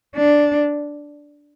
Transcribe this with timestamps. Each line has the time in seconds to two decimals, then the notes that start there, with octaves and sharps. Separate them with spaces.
0.16 D4